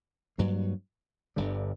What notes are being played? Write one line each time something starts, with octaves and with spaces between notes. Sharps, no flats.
G2 F#3 A#3
G1 G2 D3 G3